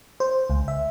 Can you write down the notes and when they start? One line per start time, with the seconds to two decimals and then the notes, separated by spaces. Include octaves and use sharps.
0.20 C5
0.50 C#2
0.68 E5